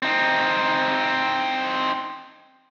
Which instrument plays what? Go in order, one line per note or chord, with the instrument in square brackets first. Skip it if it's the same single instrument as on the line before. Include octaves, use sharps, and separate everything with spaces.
[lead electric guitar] C4 D#4